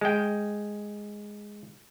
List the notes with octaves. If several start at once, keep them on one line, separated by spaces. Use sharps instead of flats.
G#3 G5